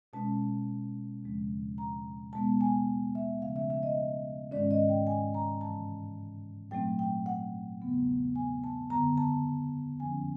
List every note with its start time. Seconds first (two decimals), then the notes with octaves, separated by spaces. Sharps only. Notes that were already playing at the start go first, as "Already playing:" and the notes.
0.13 B2 G#3 C#4 A5
1.23 D#2 C#3 F3 G#3 C4
1.78 A#5
2.33 B2 G#3 B3 A5
2.61 G#5
3.15 E5
3.42 C#3 F3 A3 C#4 F5
3.56 E5
3.70 E5
3.83 D#5
4.52 G#2 D#3 G#3 C#4 D5
4.71 D#5
4.89 G5
5.07 G#5
5.34 A#5
5.61 G2 E3 G#3 C#4 A5
6.71 A#2 F#3 A3 C4 G5
6.99 G5
7.26 F#5
7.81 E2 C#3 F#3 B3
8.36 G#5
8.64 A5
8.90 F#2 D3 G3 B3 A#5
9.18 A5
10.00 F2 D3 F3 A#3 C#4 G#5